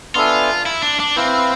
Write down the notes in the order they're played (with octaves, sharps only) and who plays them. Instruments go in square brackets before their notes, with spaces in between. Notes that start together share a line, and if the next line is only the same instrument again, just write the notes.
[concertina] B3 D4 A4 E5 G#5 [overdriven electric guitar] F4
[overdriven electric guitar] E4
D4
D4
[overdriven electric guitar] C4 [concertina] E4 B4 F5